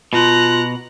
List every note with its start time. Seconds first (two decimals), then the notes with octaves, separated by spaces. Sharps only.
0.13 B2 F4 A#5 F#6